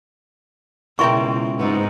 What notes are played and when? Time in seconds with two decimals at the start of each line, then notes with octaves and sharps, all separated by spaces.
0.99 C#2 B2 E4 A#4 E5 G5 C6 C#6
1.59 G#2 B3 C4 D#4